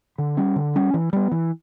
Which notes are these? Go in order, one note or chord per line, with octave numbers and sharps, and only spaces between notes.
D3
G3 C#4
D3
G3 C#4
E3
G3 B3
E3